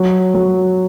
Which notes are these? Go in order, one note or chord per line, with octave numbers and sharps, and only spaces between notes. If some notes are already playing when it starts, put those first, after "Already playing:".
Already playing: F#3
F#3